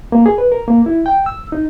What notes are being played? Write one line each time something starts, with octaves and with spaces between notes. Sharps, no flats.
A#3
G#4
B4
A#4
A#3
E4
G5
E6
D#4